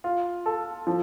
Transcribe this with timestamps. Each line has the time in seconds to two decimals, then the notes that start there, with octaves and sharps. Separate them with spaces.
0.04 F4
0.46 A4
0.87 F3